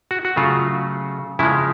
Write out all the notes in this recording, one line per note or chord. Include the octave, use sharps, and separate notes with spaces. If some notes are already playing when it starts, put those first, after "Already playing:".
F#4
F#4
C#3 F#3 A3 F4
C#3 F3 G#3 E4